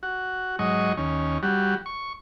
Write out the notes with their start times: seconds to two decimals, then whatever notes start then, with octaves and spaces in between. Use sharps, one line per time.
0.03 F#4
0.59 G#2 F#3 D#5 C#6
0.97 D#2 C#4
1.43 G3 F#4
1.86 C#6